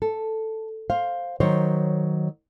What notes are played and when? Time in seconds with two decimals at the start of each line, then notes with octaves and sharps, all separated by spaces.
0.02 A4
0.90 C5 F5
1.40 D#3 F#3 C5 C#5